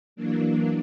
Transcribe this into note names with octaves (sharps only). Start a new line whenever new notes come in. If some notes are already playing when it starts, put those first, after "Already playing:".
E3 F#3 A#3 D4